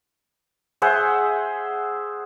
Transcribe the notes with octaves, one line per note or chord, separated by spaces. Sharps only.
G#4 C5 E5 F#5